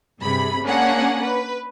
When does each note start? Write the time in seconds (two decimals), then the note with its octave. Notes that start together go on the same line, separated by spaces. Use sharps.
0.21 G2 C3 G#4 B5
0.63 A#3 C#4 D4 G#4 F#5
1.22 B4